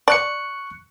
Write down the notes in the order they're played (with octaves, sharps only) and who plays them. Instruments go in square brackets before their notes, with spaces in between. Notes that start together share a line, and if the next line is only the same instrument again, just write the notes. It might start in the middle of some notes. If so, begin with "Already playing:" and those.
[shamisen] D5 [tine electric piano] C#6 F#6 C#7